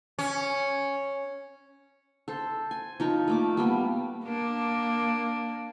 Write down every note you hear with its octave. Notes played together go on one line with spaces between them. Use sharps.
C#4
A4 C5
G#5
F3 D#4 A#4 C#6
A3 A#3 D6
G3 A#3 B3
A#3 D4